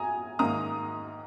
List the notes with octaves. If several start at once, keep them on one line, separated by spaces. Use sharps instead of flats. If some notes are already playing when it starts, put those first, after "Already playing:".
Already playing: G#5 A#5 D#6
G#2 D#3 A#3 A#5 D#6